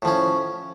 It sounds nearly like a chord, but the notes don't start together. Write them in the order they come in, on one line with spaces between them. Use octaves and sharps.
A2 F3 C#4